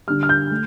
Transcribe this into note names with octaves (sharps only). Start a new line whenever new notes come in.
D3 G3 F6
F6
G6
A3